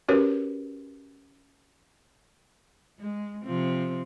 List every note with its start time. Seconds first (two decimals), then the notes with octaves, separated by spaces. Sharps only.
0.08 C#4 F#4 G4 A#4 B4 C#5
2.99 G#3
3.44 C3 F3 C4